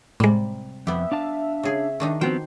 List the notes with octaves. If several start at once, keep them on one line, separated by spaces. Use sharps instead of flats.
A2 C3 G3 G#3
F2 B3 G4 E5
D4 F5 A5
C#3 G#4
D#3 D4 D#4
F3 B3 C4 F#4 C5 G5